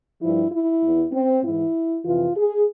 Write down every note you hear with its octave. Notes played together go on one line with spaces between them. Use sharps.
G2 F3 E4
E4
E2 E3
C4
G#2 E3 E4
F2 C3 E3 F4
G#4